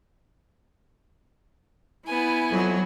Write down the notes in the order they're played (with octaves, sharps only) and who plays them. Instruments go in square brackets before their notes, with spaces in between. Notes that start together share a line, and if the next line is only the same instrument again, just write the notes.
[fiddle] B3 G#5 [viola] E4
[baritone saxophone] F2 [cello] F#3